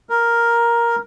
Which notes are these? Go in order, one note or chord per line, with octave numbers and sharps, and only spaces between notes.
A#4